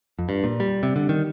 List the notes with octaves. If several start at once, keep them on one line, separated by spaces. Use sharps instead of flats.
F2
G2
A#2
G3
C3
D3
D#3